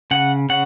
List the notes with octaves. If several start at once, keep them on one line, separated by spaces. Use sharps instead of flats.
C#3 F#5
C#3 F#5